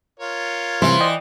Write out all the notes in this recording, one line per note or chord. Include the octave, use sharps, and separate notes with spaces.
F4 A#4 C#5
C3 E3 G3 C5
D5 D#5 G5